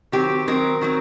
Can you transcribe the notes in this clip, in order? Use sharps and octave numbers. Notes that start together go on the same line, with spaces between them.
D#3 F#3 C4 G4
D#3 F#3 C4 A#4
D#3 F#3 C4